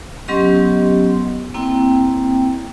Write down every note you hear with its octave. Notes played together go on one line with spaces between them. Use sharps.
F#3 B3 C#4 G4 D#5 C6
A#3 C4 E4 G5